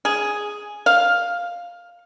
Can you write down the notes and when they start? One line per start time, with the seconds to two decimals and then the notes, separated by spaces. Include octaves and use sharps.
0.05 G#4
0.86 F5